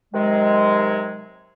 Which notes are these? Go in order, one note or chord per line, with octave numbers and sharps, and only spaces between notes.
C3 D#3 F#3 G#3